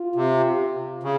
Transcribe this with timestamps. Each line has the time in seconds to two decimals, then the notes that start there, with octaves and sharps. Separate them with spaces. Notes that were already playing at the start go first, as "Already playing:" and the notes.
Already playing: F4
0.15 C3
1.03 C#3